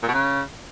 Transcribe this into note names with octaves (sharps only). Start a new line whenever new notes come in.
A#2
B2
C#3